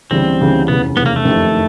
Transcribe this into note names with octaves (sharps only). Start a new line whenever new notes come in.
D2 C#3 E3 G3 C4
D2 C#3 E3 G3
F1 E2 C#3 B3
F1 E2 C#3 B3
A#3
A3
F#1 F2 C3 D#3